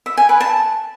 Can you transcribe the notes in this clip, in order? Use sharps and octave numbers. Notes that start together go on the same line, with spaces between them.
E5
G#5
B4
A5